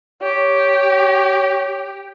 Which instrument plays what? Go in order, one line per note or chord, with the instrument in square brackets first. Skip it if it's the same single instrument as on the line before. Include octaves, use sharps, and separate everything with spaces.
[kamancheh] G4 [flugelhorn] C#5